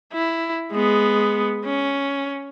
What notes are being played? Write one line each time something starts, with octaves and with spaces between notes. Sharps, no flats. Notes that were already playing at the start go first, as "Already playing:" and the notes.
E4
G#3 B3
C#4